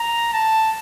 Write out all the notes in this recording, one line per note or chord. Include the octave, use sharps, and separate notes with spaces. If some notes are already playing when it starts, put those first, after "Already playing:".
Already playing: A#5
A5